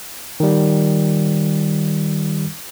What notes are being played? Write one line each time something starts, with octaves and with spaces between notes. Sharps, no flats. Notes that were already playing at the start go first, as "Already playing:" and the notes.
D#3 G3